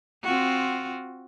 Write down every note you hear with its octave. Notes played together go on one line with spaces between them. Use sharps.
C4 F4 F#4